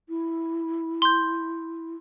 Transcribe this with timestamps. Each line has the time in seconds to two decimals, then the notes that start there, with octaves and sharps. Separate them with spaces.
0.09 E4
1.02 C6 G6